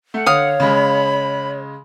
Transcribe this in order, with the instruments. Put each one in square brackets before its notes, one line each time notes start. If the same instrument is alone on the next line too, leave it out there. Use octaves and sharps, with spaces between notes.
[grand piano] A3 [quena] F#5
[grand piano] D3 [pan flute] C#5 [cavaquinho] F5 D#6
[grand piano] C#3 G#3 [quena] B5